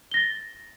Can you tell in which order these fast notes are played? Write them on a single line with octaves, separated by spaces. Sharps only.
G7 A#6 A6